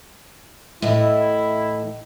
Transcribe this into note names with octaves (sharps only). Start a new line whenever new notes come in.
A2 E3 E4 D#5